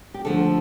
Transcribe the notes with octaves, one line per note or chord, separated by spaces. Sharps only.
G4
D3 F3 A3 A4